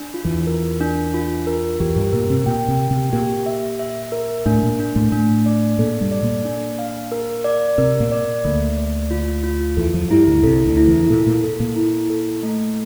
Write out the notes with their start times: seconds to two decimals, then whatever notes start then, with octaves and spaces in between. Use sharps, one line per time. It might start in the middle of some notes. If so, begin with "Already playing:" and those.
Already playing: D4
0.14 F4
0.25 E2 E3
0.47 A#4
0.80 D4
1.14 F4
1.47 A#4
1.80 E2 E3 G4
1.96 G2 G3
2.13 A#2 A#3 A#4
2.30 C3 C4
2.46 A#2 A#3 G5
2.68 C3 C4
2.80 G5
2.91 C3 C4
3.13 A#2 A#3 G4
3.46 E5
3.79 E5
4.12 A#4
4.46 A2 A3 D4
4.63 A#2 A#3
4.79 D4
4.96 A2 A3
5.12 A2 A3 D4
5.46 D5
5.79 A#2 A#3 A4
6.01 G2 G3
6.12 D5
6.22 A#2 A#3
6.45 D4
6.79 F5
7.12 A#4
7.44 D5
7.78 C3 C4 A#4
8.00 A#2 A#3
8.12 D5
8.44 D2 D3 A#3
8.77 D5
9.11 F4
9.43 F4
9.77 E2 E3 A4
9.94 F2 F3
10.10 G2 G3 E4
10.27 D2 D3
10.43 C2 C3 A4
10.66 D2 D3
10.77 E4
10.87 E2 E3
11.10 A#2 A#3 A4
11.27 A#2 A#3
11.44 A4
11.60 A#2 A#3
11.76 E4
12.10 A4
12.43 A3